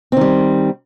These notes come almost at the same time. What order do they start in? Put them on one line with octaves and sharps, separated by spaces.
C4 D#3 G3